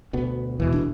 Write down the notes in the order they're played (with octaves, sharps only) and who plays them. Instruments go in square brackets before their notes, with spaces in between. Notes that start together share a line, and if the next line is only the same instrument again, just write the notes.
[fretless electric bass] D2 B2 B3
[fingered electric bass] E1 [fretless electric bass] B2 E3
[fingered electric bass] F1 D3 D4